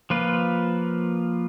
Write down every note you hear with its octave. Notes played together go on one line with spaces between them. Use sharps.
F3 A#3 F4 B4